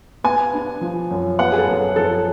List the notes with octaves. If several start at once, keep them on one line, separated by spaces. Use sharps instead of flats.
B3 G#5
D4
F3
F#2
B3 F#5
G#4
A4
F#2
F3 A4